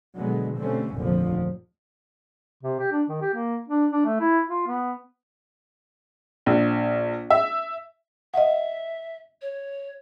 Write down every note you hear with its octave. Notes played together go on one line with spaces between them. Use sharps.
B2 D3 F#3 G#3 B3
B2 D3 G3 A3 C4 C#4
F1 A#1 D#2 A#2 D3 F3
C3
G4
D4
D#3
G4
A#3
D4
D4
A3
E4
F4
B3
A#1
E5
D#5 E5 F#5
C#5